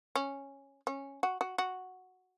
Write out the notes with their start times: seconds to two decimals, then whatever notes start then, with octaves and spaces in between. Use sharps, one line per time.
0.15 C#4
0.87 C#4
1.23 F#4
1.41 F#4
1.58 F#4